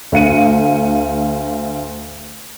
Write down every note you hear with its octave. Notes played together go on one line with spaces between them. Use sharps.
D2 F5 C#7 D#7